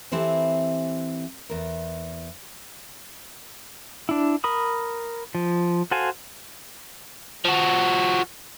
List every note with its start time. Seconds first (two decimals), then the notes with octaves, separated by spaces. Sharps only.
0.12 E3 C4 E4 G4 A4
1.50 E2 A#4
4.09 D4 E4
4.44 A#4 B5 D#6
5.35 F3
5.91 F#4 A4 C5 F5 G#5
7.45 F3 F#4